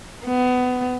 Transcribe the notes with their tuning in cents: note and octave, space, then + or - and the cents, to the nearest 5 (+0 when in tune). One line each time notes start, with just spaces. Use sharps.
B3 +20